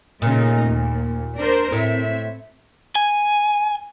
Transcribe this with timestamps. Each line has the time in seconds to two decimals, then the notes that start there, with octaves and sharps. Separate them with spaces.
0.22 A#2 C#3 A3 D#4
0.66 D#2
1.38 D4 A#4 C5
1.72 A2 C4 E5
2.96 G#5